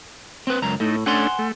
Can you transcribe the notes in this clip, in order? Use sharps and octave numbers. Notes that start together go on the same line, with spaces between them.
C4 B4
C#2 F#2 A#5
A2 A3 D#4
A3 C#4 D4 F#5 G#5 C6
A3